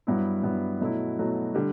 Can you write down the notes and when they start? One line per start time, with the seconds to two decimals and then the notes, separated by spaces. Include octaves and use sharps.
0.07 G2 F#3 B3 E4
0.43 G2 F#3 B3 E4
0.81 B2 F#3 A3 E4
1.17 B2 F#3 A3 E4
1.55 D3 G3